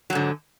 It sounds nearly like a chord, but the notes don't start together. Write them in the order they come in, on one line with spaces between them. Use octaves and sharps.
F#3 G#2 D3